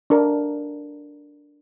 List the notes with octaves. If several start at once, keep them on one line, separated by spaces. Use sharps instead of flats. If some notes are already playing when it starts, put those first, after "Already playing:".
D4 A#4